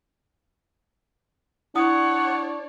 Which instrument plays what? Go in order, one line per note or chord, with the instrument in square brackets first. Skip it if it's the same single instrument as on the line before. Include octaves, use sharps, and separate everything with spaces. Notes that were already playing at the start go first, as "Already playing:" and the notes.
[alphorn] D4 [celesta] E4 D#6 [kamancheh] C#5 D5 [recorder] F#5